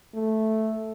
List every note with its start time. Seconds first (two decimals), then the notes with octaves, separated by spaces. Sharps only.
0.15 A3